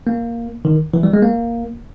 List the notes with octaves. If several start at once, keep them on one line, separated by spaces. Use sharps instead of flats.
A#3
D#3
E3
G3
G#3
A#3